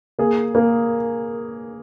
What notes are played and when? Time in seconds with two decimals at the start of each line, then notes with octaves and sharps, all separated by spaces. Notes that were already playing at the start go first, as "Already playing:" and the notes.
0.19 A#3 G#4
0.55 A#3